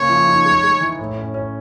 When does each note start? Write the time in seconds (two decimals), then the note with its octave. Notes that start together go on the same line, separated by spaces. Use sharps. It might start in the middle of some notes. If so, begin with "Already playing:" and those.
Already playing: C#3 A#3 C#5
0.09 F3
0.27 D#4
0.45 G#3
0.63 G#3
0.81 E3
0.99 A2
1.17 C#4
1.34 C#4